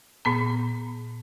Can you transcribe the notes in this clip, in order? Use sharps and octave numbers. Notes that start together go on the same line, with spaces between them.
A#2 B3 A#5